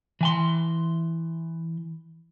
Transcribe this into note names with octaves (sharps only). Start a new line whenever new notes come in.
E3 G#5 C6